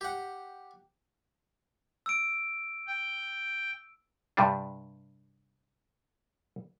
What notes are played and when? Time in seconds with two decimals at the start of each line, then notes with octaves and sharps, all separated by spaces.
0.01 G4 F#5
2.06 E6 D7
2.87 G5
4.37 G2 C3 G3 D4